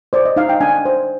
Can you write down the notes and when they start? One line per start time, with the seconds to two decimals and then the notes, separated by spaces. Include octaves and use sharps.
0.13 C5 D5
0.25 D#5
0.36 D#4 F5
0.49 G5
0.61 D4 G#5
0.85 C5